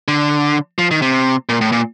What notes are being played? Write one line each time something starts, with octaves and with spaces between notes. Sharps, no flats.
D3
F3
D#3
C3
A#2
A2
A#2